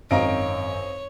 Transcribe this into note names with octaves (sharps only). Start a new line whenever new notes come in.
G#1 F#2 C4 C#5 D#5 F5 A#5 D7